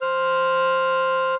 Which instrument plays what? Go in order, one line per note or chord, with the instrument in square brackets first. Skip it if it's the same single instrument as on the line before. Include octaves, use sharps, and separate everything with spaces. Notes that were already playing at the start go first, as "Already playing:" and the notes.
[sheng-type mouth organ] C5 F6